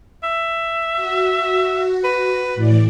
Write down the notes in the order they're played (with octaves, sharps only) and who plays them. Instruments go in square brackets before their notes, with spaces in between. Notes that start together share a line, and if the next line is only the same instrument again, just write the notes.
[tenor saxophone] E5
[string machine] F#4
[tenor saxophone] B4
[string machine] A2 E3 D5